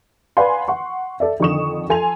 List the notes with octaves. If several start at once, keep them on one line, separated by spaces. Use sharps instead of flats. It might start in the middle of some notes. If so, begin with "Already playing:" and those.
B4 D5 F5 F#5 G#5 C6
F#5 C6 C#6
A4 D5 E5
F2 D3 D#3 C#6 D#6 E7
F3 A4 G#5 C6 F7